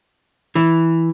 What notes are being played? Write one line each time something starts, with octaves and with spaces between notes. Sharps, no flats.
E3